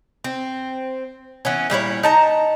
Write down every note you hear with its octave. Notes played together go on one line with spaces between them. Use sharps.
C4
E3 B3 C#4
A#2 G3 E4 C#5
D#4 A5 A#5